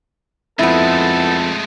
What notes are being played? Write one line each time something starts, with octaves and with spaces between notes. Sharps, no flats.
F2 G#3 A3 B3 E4 A4